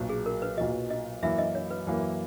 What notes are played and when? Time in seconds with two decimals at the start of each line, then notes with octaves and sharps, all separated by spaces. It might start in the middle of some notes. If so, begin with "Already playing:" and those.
Already playing: B1 A#2 F#3
0.09 G#4
0.26 A#4
0.42 B4
0.57 B1 A#2 F#3 D#5
0.90 D#5
1.23 F#2 E3 A#3 E4 E5
1.38 D#5
1.55 C#5
1.70 B4
1.86 F#2 E3 A#3 E4